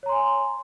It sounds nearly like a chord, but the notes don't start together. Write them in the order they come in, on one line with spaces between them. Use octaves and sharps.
C#5 A#5 C6 G#5